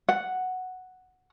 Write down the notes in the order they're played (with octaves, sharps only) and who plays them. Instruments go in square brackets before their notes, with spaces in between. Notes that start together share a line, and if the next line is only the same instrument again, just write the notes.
[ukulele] F#5